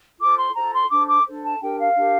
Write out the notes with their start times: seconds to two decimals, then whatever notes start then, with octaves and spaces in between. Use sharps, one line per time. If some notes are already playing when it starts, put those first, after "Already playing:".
0.19 F4 A4 C5 D6
0.37 C6
0.55 F4 A4 C5 A#5
0.73 C6
0.89 D4 A4 C5 D6
1.07 D6
1.25 D4 A4 C5
1.43 A5
1.60 D4 G4 A#4 G5
1.78 F5
1.96 D4 G4 A#4